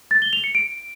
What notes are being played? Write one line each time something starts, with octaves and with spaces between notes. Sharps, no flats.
A6
G7
F7
C#7
D7